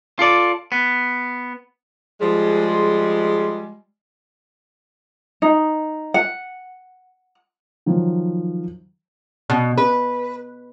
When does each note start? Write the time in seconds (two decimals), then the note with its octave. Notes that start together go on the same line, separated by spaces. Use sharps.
0.19 F4 A4 D5
0.72 B3
2.21 F3 G3 G#3
5.42 D#4
6.14 F#5
7.86 D#3 F3 F#3
9.50 B2
9.78 B4